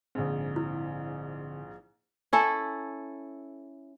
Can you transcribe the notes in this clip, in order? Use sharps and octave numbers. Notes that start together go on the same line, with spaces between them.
A#1 G#2 D3 C4
E4
C#4 E4 A4